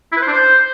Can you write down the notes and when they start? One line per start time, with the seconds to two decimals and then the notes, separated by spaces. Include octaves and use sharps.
0.12 E4
0.17 B4
0.22 C5
0.27 D4
0.32 C5